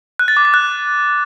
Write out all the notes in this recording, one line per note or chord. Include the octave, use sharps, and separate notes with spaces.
F#6
A6
D6
A6
F#6